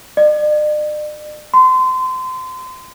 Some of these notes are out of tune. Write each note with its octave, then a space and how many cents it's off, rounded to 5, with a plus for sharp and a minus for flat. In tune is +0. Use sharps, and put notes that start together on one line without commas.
D5 +45
C6 -30